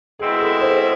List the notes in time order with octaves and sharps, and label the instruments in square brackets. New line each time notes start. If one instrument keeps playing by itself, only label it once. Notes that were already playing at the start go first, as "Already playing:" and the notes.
[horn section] B2 G#3 C4 E4 [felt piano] G#4
[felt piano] A4
C5